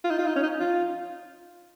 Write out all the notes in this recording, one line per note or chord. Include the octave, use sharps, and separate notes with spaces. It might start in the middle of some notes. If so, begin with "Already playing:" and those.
F4
D#4
F4
D#4
C#4
D#4
F4